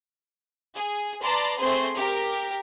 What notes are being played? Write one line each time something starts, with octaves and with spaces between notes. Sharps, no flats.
G#4
B4 D5 A5 A#5 C6
A3 C4 G#4 C5 C6
G4 A#4